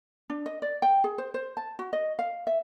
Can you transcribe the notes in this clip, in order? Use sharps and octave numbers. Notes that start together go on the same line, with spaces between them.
D4
D#5
D5
G5
G#4
C5
C5
A5
F#4
D#5
F5
E5